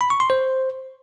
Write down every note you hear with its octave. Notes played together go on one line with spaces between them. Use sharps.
B5
C#6
C6
C5